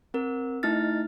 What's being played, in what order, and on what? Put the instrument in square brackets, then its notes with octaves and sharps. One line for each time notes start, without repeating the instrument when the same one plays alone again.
[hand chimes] C4 A#4
A3 D#4 E4 F6 A6